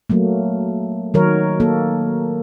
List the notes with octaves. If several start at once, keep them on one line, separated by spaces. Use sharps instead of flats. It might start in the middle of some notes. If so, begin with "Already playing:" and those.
F#3 A3 A#3
D#3 F#3 A#4 C#5
A#3 A4